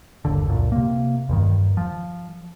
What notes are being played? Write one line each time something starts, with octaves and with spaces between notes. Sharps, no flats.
G1 D#2 D3
C#2 F#2 A#2
C3 A#3
E2 G2 D#3
F3